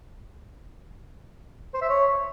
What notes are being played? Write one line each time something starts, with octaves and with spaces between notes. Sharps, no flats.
C5
E5
C#5